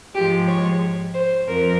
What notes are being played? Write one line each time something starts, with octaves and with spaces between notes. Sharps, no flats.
G#2 F3 G#3 G4
C#5
C5
F2 A#4